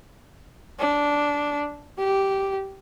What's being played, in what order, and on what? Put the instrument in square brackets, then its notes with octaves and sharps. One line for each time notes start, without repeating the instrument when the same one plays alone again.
[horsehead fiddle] D4
G4